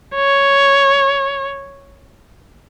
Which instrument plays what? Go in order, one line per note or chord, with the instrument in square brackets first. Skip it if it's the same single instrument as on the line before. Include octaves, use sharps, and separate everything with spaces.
[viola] C#5